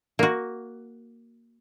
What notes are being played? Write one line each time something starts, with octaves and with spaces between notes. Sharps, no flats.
A#3 F#4